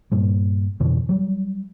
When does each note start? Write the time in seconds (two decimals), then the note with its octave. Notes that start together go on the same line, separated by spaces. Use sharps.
0.12 G2 A#2 G3
0.80 F2 B2 D3 E3
1.09 F#3 G3